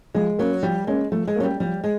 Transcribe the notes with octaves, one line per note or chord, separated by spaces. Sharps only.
F3 G#3
F#3 A#3 C#4
F3 G3
G#3 A#3 C#4
F3 A3
G#3
F#3 A#3 C#4
G3
F3 G3
G#3